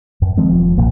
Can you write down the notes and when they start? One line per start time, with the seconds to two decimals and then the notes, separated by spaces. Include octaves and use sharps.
0.22 F#2
0.37 D#3 F3 G#3 C4
0.50 E1 F3
0.78 D#1 B1 A#2 A#3